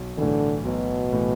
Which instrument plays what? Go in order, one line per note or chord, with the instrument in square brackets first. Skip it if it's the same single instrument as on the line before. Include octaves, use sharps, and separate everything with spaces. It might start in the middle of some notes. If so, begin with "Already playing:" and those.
Already playing: [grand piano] B1
[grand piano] A2 E3 [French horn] D3
[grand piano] B1 [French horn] B2
[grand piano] A2 E3